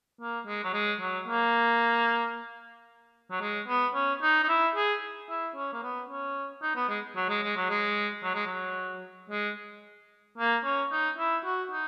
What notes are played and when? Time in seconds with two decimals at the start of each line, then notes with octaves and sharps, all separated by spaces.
0.21 A#3
0.46 G#3
0.64 F#3
0.74 G#3
1.00 F#3
1.28 A#3
3.31 F#3
3.41 G#3
3.68 B3
3.95 C#4
4.22 D#4
4.43 D#4
4.49 E4
4.75 G#4
5.29 E4
5.56 C#4
5.73 A#3
5.83 B3
6.09 C#4
6.62 D#4
6.76 B3
6.89 G#3
7.16 F#3
7.29 G#3
7.43 G#3
7.56 F#3
7.70 G#3
8.23 F#3
8.35 G#3
8.47 F#3
9.30 G#3
10.38 A#3
10.64 C#4
10.91 D#4
11.19 E4
11.45 F#4
11.71 D#4